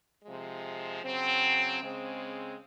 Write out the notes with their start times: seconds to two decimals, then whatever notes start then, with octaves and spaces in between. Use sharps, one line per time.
0.24 C3 F3 G#3
1.02 C#3 F#3 C4
1.80 C#3 G#3 C4